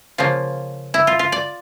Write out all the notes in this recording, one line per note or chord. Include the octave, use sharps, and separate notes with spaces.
C#3 F3 A#3 F4
E4
F4
F4
D5